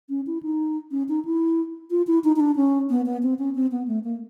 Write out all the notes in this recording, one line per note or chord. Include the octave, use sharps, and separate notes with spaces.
C#4
E4
D#4
C#4
D#4
E4
F4
E4
D#4
D#4
D4
C#4
B3
B3
C4
C#4
C4
B3
A3
A#3